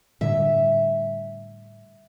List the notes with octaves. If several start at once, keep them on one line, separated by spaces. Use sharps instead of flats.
A2 D3 G3 E5